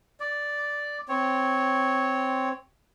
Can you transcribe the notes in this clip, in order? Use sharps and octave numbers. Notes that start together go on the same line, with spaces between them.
D5
C4 C#5